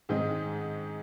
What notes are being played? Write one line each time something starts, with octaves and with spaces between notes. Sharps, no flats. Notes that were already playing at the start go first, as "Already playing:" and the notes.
G#2 D#3 G#3 C4 D#4